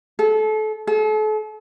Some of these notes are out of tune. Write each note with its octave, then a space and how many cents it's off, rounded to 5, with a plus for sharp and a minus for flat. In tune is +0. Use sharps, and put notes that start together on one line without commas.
A4 -30
A4 -40